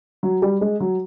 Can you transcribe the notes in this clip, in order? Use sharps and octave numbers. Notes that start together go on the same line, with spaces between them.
F#3
G3
G#3
F#3